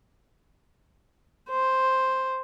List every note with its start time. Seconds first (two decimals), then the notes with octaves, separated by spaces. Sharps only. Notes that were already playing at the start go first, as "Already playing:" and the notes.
1.50 C5